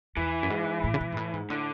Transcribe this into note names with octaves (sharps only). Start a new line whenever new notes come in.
E2 E3
F#2
G#2
A2
C#3
B2
G#2
A2
G#2
A2 D3